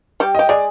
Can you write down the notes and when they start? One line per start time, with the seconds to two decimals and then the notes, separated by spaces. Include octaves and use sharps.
0.20 G3 G4
0.35 G4 D#5
0.49 G#3 G#4 D5